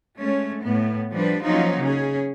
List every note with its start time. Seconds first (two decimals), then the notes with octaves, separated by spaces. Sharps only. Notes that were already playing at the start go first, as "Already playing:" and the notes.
0.19 G#3 A3 C#4
0.62 A2 B3
1.13 F3 G3 D4 B4
1.43 F3 F#3 A#3 C#4 D#4 F4
1.79 C#3 C#4 G#4